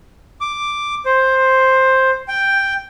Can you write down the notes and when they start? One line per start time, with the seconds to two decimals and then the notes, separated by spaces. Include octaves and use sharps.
0.41 D6
1.05 C5
2.28 G5